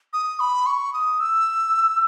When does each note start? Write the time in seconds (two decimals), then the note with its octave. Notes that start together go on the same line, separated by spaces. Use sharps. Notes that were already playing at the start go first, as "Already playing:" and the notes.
0.13 D#6
0.40 B5
0.66 C#6
0.93 D#6
1.20 E6